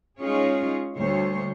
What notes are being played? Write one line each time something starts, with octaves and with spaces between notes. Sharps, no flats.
G#3 C#4 D#4 F4 G#4 C#5
D2 G3 C5 C#5